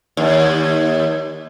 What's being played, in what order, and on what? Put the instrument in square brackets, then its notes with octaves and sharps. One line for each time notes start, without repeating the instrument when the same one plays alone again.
[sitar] D#2